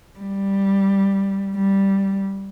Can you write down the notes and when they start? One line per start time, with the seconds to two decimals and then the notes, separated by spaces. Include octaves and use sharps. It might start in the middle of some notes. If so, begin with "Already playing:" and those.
0.19 G3
1.55 G3